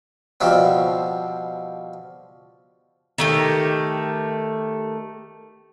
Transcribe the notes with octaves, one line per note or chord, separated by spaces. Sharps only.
B2 F3 G3 C4
D#3 A3 G4